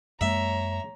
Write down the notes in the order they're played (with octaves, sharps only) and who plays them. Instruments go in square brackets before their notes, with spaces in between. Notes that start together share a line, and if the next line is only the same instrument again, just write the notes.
[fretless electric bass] F#2 G#3 A#3 [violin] C#5 A#5 [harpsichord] E5